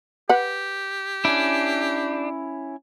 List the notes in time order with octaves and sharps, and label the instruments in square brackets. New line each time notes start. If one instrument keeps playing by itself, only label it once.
[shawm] G4 [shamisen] B4 F#5
[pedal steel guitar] C#4 E4 [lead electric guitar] D4